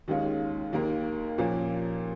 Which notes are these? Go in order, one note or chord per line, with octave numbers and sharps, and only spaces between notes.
D#2 D#3 G#3 C#4 F4
D#2 D#3 A#3 F4 A#4
A#2 F3 A#3 C#4 A#4